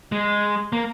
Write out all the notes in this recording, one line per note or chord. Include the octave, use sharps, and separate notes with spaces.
G#3
A#3